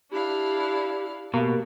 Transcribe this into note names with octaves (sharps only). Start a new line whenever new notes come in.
D4 E4 G4 F5
B2 A#3 G4